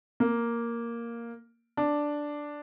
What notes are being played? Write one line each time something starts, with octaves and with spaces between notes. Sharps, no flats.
A#3
D4